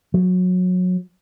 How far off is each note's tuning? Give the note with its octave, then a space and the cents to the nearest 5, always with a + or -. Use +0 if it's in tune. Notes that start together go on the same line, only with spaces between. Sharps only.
F#3 -25